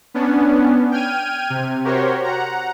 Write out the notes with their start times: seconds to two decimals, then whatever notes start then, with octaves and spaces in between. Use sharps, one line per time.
0.14 B3 C#4 D4
0.91 G5 F6 G#6 D#7
1.50 C3
1.84 F#4 G4 A#4 C5 C#5
2.24 F#5 A#5